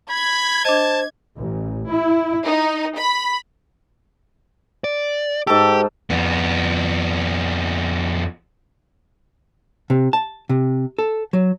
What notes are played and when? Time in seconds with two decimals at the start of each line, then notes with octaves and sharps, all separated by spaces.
0.11 B5 G#6
0.65 D4 C5 D#5 A5
1.39 A1
1.91 E4
2.47 D#4
2.97 B5
4.84 D5
5.47 G#2 G4 A4
6.10 F2 B3
9.90 C3
10.13 A5
10.49 C3
10.98 A4
11.33 F#3